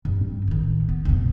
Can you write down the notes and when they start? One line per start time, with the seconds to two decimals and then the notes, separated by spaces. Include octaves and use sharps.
0.05 G2
0.29 C4
0.48 A1 D#3
0.89 B3
1.05 F1 B2